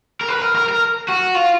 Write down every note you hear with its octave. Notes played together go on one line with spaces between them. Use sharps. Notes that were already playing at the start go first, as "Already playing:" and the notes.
A#4
B4
A#4
A#4
A#4
F#4
F4